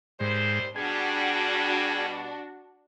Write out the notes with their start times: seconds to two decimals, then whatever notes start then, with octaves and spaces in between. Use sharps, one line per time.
0.20 D#2 G#2 G3 C5
0.76 B2 G3 D4 F#4 G#4